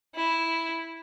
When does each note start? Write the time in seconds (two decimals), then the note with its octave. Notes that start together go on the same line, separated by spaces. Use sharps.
0.15 E4